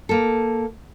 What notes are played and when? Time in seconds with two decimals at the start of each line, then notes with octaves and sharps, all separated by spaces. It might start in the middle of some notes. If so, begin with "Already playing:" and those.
0.09 A#3 A4